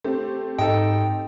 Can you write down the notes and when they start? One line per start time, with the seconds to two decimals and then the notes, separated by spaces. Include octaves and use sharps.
0.04 A3 C4 G4
0.59 G#2 D#4 A4 G5